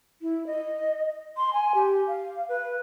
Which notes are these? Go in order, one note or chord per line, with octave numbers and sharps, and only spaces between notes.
E4
D#5
C6
G#5
G4
F5
B4